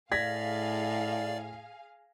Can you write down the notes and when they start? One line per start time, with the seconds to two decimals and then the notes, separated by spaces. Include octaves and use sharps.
0.12 A2 G#4 D5 F5 G#6 A#6 B6